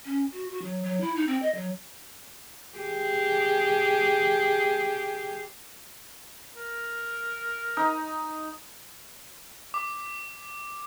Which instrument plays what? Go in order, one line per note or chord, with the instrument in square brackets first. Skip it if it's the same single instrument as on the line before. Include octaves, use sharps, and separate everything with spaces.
[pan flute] C#4
F#4
F#4
F#3
F#3
E4
D#4
C4
D#5
F#3
[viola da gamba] G4 G#4
[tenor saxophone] A#4
[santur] D#4
[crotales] D6